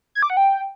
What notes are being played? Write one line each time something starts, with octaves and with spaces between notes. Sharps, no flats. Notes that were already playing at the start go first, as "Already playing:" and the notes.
G#6
D6
F#5
G5